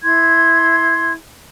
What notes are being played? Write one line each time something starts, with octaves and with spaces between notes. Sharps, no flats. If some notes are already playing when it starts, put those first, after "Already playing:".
E4 C6 G#6